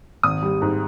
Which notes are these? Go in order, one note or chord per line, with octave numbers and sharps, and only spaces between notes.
G#1 D#6
G3
G#2